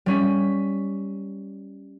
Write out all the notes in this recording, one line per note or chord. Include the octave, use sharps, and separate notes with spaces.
G3 C#4 B6